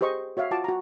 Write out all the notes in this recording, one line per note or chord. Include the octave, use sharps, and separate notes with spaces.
G4 G#4 C5 D#5 C#6
F#4 C#5 E5 F5
F4 F#4 F#5 A5 D6
F#4 A#5